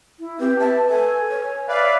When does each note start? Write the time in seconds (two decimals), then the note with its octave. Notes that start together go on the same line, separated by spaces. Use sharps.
0.19 E4
0.40 C4 G4 B4
0.59 E5 A5
0.89 A4 G#5
1.30 C#5
1.69 B4 D5 E5 F5